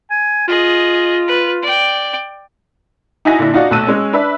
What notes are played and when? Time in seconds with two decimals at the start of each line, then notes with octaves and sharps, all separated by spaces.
0.10 G#5
0.48 F4 G#4 D#5
1.28 B4
1.62 D5 G5
3.25 D#4 E4 F#4 G#5 A#6
3.39 A#2 D3 D4 E4
3.53 D4 D#4 F4 F#4 D5
3.71 B1 A3 A5 E6 F#6 D#7
3.87 G#3 C#4
4.13 D4 B4 E5